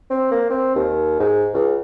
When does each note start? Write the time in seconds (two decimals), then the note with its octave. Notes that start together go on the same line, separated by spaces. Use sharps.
0.10 C4
0.31 A#3
0.50 C4
0.75 D#2
1.20 G#2
1.54 C#2